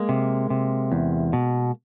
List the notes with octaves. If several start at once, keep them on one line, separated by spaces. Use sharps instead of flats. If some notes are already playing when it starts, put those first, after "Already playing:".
Already playing: G#3 A#3
C3
C3
E2
B2